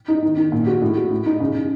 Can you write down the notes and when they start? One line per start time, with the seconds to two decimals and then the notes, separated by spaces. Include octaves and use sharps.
0.08 D#4
0.22 D#3
0.37 D#3
0.52 A#2
0.67 F#4
0.81 A2
0.96 F#4
1.11 A2
1.26 D#4
1.40 C#3
1.55 C#3